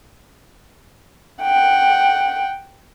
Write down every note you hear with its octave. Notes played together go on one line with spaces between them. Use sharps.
F#5 G5